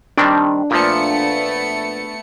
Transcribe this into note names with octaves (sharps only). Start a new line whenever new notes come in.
D#3 G3 C4 D4
A#2 F3 A3 B3 C#7